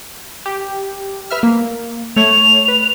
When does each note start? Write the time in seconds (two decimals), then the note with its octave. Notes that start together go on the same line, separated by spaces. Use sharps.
0.46 G4
1.30 B4 E5 F6
1.43 A#3
2.16 A3 C#5 F7
2.68 B4